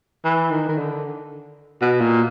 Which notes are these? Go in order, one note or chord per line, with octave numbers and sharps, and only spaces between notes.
E3
D#3
D#3
D3
B2
A#2